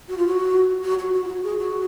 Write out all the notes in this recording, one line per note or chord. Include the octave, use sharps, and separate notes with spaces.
F#4
F4
F#4
F#4
F#4
F#4
F4
F#4
G#4
F#4